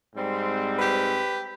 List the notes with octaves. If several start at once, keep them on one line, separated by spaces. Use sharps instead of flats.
G#2 G3 C4
G4 B4